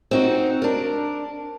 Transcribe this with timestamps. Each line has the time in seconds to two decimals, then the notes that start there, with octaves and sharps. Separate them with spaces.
0.11 C4 D#4 F#4
0.62 D4 A#4